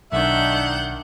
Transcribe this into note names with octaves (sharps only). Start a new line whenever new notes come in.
B1 D#3 D4 E5 F#5 G6